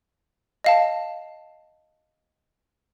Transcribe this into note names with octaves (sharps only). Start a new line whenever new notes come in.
D#5 F5 A5